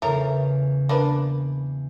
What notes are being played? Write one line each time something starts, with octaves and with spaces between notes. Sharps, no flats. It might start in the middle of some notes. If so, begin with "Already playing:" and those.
E2 C#3 A3 A#4 C#5
A#3 D4 B4